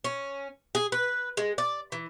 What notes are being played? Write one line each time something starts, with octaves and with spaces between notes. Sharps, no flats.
C#4
G#4
B4
G#3
D5
E3